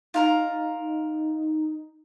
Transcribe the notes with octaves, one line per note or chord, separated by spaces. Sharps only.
D#4 F4 A#4 A#5